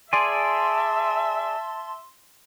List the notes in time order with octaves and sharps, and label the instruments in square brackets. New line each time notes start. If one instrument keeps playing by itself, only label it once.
[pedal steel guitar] G#4 D5 G#5 [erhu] E5 [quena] A5 [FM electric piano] C6